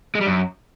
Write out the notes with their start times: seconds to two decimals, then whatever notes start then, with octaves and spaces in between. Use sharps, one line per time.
0.15 G#3
0.21 G3
0.27 F#2